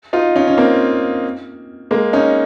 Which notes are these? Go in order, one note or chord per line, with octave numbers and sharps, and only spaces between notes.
D#4 F4
C#4 D#4
C#4
A#3 C4
G#3 A#3
C#4 D#4